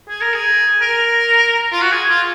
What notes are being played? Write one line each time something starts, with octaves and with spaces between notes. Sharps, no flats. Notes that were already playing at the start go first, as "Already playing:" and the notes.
G#4
A#4
G#4
A#4
F4
F#4
G#4
F4